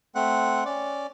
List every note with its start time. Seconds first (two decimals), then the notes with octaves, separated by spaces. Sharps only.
0.15 A3 C4 F#5
0.65 C#4 D5